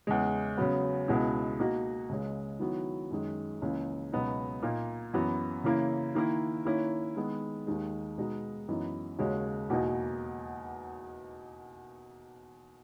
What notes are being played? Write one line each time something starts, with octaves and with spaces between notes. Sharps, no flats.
E2 C#3 G#3
C#3 F#3 B3
C#2 B2 G#3 B3 E4
B2 A#3 D#4 F#4
C#2 C#3 G#3
D#3 F#3 B3 E4
F#2 D#3 G#3
C#2 C#3 E3 A#3
C#2 B2 F#3 B3 D#4
A#2 A#3 D#4
F#2 E3 B3 F#4
C#3 E3 A#3 E4
D#3 A#3 E4
D#3 A#3 C#4 E4
D#3 G#3 B3
D#2 D#3 G#3
B2 G#3 B3 D#4 F#4
F#2 E3 B3 D#4
D#2 C#3 G#3 C#4 F#4
E2 B2 A#3 D#4 F#4